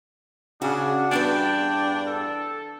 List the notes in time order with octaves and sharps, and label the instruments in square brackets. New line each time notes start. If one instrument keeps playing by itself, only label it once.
[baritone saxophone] C#3 [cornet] D4 [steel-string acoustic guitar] F#4
[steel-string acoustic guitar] E2 G2 B4 [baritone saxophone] D4 [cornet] G5
[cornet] A4